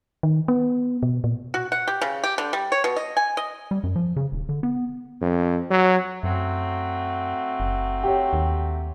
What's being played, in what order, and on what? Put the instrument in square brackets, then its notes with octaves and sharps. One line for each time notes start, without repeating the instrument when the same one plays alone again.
[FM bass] D#3
B3
B2
A#2
[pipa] F#4
F#5
G4
C#3
G4
D3
G3
C#5
B2
D#5
G#5
D#5
[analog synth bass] G3
F#2
F3
C#3
D#1
D3
B3
[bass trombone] F2
F#3
[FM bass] F#2 [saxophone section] F#3 A3 C4
[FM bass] F#1
[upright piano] G4 C#5
[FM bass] D#2